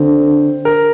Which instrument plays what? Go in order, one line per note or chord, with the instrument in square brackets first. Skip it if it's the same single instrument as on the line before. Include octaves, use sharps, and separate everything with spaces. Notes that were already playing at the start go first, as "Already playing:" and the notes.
Already playing: [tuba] D3 [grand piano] C4
[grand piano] A#4